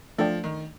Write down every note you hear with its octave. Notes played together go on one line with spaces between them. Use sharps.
F3 A3 D4 A4 D5 G5
D#3